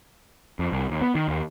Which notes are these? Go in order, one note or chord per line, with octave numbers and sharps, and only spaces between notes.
F2
C2
D#2
B3
D#3
D#2